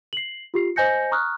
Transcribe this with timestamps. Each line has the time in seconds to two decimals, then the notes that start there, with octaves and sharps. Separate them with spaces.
0.13 C7 F#7
0.54 F4 G4 C7
0.76 C5 D#5 G#5 G6 A#6 C#7
1.12 A#5 C#6 D#6 F6 F#6